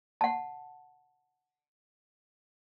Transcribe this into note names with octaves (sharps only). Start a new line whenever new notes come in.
F#5 A5